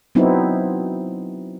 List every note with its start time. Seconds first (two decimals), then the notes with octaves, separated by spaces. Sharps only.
0.15 F#3 B3 C4 D#4 E4